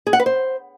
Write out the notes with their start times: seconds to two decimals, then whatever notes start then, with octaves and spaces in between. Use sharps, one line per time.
0.07 G#4
0.13 F#5
0.19 B4
0.26 C5